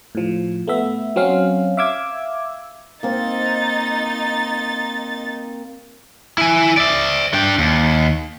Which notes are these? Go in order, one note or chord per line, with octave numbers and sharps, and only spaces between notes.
A2 F3
A3 B3 E5
F#3 C4 C#4 F5
E5 F5 D6 E6 G#6
A#3 C4 D#4 A6
E4 G#5
D5 E5
D4 G5
D#2